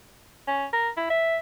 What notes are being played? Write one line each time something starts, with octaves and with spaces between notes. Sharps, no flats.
C#4
A#4
E4
E5